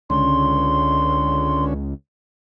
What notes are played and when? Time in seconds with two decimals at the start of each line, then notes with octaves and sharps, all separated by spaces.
0.10 C#2 D3 C#4 C6